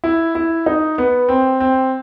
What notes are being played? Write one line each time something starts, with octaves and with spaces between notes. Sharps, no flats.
E4
E4
D#4
B3
C4
C4